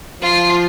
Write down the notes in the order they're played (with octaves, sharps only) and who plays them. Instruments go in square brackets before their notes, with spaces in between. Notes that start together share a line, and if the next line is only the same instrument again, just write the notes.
[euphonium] F3 [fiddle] F4